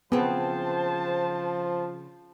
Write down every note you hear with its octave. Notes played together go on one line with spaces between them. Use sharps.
C#3 F3 B3 C4 C5 A5